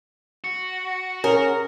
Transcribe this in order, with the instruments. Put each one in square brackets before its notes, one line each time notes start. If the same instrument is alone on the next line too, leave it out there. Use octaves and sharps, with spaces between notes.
[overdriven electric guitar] F#4
[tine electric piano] C#4 G#4 [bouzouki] A#4